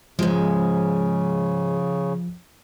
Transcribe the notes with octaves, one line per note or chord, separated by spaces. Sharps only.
G#2 C#3 F3 G#3